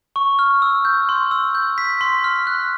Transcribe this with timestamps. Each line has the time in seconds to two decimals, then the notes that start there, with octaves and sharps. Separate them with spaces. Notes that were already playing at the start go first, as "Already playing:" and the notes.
0.16 C#6
0.39 F6
0.62 E6
0.85 G6
1.09 C6
1.31 E6
1.55 G6
1.78 B6
2.01 C6
2.24 F6
2.47 F#6